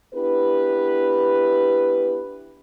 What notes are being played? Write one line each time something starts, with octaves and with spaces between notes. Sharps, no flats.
B3 D4 E4 G4 B4